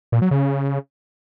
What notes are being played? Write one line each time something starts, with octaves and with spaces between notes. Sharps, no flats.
A#2
F#3
C#3